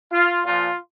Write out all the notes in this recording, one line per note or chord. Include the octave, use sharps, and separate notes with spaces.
F4
A#2 F3 F4